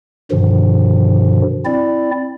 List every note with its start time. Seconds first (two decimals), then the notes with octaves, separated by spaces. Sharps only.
0.31 G2 B2 D3 D#3 F3
1.65 C4 E4 D5